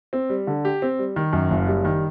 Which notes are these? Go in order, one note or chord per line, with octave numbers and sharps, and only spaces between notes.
C4
G3
D3
G4
C4
G3
D#3
F#2
F#1
G3
D#3